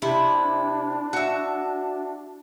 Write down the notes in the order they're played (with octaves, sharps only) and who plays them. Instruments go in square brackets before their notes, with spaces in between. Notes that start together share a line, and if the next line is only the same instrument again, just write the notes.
[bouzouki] C3 [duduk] D4 [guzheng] E4
[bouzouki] F#4 E5